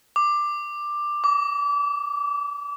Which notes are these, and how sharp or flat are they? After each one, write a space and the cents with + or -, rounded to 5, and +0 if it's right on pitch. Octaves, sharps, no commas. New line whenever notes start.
D6 +10
D6 -30